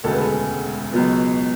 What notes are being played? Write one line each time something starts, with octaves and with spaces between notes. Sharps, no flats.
E1 D2 C#3 G#3 A4
B4
A4
C#2 B2 F#3 B3